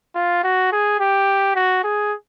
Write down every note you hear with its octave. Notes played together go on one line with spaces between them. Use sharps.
F4
F#4
G#4
G4
F#4
G#4